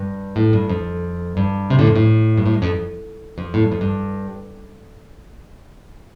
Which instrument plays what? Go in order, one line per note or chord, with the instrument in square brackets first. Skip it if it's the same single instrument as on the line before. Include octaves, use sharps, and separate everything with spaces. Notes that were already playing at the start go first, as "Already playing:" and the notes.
Already playing: [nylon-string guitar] G2
A2
G2
F2
G2
C3
A2 D3
F2
A2
G2
A2
G2
F2
F2
A2
G2
F2
G2